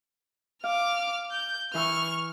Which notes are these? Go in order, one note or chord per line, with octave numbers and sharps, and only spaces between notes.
F5 D6 F6
G6
E3 B4 C#6 E6 F6